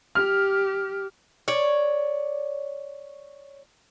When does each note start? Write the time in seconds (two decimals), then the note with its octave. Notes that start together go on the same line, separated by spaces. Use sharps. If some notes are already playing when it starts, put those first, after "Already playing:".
0.15 G4 F6
1.48 C#5 D5